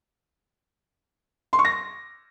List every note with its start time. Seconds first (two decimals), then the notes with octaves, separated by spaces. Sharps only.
1.53 C6
1.59 C#6
1.65 A#6